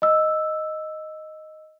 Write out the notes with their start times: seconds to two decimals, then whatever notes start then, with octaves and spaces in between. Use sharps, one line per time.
0.02 D#5 E6